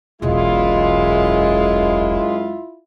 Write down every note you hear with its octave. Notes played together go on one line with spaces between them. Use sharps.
E1 B1 F#2 G#3 E4 F4